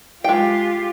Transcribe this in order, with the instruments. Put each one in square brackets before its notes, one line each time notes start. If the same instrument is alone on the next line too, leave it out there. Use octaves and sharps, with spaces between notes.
[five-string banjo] G#3 G5 [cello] F4 G4